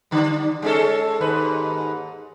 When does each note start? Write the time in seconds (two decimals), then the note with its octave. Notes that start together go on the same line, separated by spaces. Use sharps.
0.11 D3 G3
0.62 G#3 C#4 A4
1.21 D#2 G#2 B4